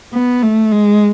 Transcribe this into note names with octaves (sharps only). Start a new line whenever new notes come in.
B3
A3
G#3